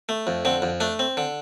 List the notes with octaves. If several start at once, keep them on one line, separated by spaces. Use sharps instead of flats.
A3
F2
D3 C4
F2
A3 D4
C4
D3